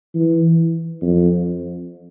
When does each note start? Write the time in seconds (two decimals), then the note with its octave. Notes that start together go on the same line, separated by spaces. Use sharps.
0.15 E3
1.01 F2